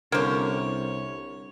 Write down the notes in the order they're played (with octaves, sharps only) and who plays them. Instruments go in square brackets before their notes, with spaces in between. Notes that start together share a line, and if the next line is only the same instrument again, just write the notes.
[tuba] C2 [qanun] D3 C#4 [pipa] A#3 C5 [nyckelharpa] C#5